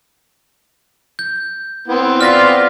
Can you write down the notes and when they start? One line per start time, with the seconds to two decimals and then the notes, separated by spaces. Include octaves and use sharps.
1.19 G6
1.88 B3 C4 E4
2.21 F4 D5 F6 A#6 B6